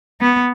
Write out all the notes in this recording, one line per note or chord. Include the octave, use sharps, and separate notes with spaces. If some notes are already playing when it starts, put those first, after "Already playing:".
B3